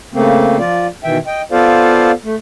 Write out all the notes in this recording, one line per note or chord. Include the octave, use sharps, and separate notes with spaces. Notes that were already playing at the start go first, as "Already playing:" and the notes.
C#3 A3 A#3 C4
F3 F4 D5
B2 D#3 E3 E5 G5
D#5 G5
B3 F4 A4 C5 D5 F5
A3